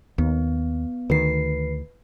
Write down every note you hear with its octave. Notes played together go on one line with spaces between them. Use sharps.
D#2 B3
D2 D#3 B4 C7